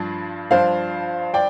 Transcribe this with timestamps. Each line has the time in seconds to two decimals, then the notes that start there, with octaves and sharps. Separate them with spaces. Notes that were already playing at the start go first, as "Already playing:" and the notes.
Already playing: G2 F3 D4
0.51 G2 F3 D4 C5 F5
1.34 D5 G5